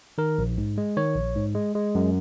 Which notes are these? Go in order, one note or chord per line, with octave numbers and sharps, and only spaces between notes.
D#3 A#4
A#1
G#2
G#3
D#3 C#5
A#1
G#2
G#3
G#3
F#2